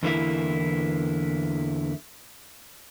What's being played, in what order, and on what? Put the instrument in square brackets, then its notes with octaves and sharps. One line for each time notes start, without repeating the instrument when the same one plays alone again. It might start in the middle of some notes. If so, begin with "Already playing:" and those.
[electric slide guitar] E2 D3 E3 A#3 E4